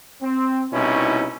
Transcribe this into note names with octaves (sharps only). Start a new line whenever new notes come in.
C4
C2 B2 C#4 D#4 E4